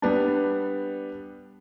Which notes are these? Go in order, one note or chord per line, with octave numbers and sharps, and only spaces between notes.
G3 B3 D4